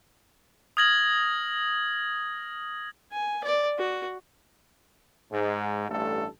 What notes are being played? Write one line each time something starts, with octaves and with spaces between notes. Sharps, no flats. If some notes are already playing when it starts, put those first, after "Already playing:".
D#6 F6 G#6 A#6 F#7
G#5
D5
F#4
G#2
A1 G2 A3 A4